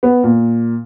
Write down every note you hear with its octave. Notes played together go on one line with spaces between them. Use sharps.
B3
A#2